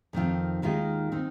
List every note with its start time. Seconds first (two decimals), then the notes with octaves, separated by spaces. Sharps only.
0.13 F2 D#3 C4 F4
0.62 D#2 D#3 G#3 F4
1.12 D#3 C4 D#4